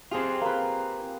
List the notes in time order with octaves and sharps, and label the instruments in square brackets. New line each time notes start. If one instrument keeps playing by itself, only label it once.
[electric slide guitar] C4 F4 [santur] G4 G#4 C6
[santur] A#3 B4